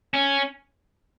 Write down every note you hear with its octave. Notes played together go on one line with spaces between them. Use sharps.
C#4